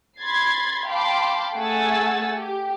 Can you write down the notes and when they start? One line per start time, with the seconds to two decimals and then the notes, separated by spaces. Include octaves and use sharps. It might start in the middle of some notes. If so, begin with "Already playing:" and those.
0.19 B5 C6 G#6 A6 C7
0.87 F5 G5 A5 B5 C6 D6
1.56 A3 G#4 F#5 G#5 E6 A6
2.36 G4